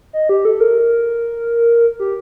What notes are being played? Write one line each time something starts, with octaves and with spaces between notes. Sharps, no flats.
D#5
G4
A4
A#4
G4